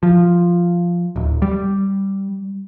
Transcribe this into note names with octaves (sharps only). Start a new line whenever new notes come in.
F3
D1
G3